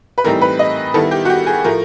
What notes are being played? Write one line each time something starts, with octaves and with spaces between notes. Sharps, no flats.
B4
A2 E3 G3 C4 D#4 A#4
B4
D#5
D#3 G3 B3 E4 A4
G4
F#4
G4
G#4
A2 F3 A3 A#4